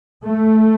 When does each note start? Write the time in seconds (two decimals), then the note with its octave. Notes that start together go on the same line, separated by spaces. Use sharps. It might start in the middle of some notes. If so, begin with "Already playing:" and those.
0.24 A3